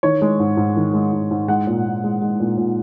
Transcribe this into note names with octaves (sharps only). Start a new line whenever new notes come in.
D#3 C#5
G#3
G#2
G#2
D#3
G#3
G#2
G#2
G#3 F#5
A#2
A#2
G#3
G#3
A#2
A#2